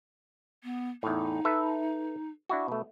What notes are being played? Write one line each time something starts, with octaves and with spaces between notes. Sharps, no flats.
B3
E2 A2 D#4
A4 B4 E5
D4 E4 F#4
B2 A3